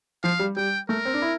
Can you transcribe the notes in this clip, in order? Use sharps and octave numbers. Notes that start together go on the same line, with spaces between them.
F3 F5
G3
G3 G5
A3 A#4
C4
D4
E4